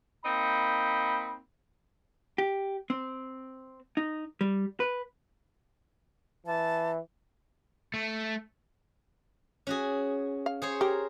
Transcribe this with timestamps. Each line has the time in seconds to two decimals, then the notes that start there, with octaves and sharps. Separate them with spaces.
0.25 A#3 C4 D#4 B5
2.38 G4
2.90 C4
3.97 D#4
4.41 G3
4.80 B4
6.46 E3 A5
7.94 A3
9.67 C#4 F#4 G#4
10.46 F5
10.62 G#4 C5 C#5
10.81 G4 A#4